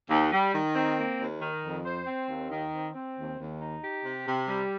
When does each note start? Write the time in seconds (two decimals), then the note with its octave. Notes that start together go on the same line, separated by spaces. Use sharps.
0.09 D#2
0.32 G3
0.53 D#3
0.75 C4
0.98 A#3
1.19 D#2
1.41 D#3
1.63 F2
1.85 C5
2.07 C4
2.29 D#2
2.51 D#3
2.72 C4
2.94 C4
3.17 D#2
3.38 D#2
3.60 D#4
3.82 G4
4.04 C3
4.26 C3
4.48 G3